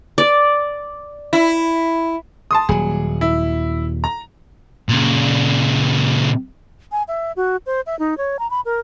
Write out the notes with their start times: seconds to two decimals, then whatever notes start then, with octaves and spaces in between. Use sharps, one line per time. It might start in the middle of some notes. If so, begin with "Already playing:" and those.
0.18 D5
1.33 E4
2.51 A5 C6 D#6
2.69 D#1 F#3 G#4
3.21 E4
4.04 A#5
4.89 A#2 C#3
6.92 G#5
7.08 E5
7.37 F#4
7.66 C5
7.87 E5
7.99 D#4
8.18 C#5
8.39 A#5
8.51 B5
8.65 A#4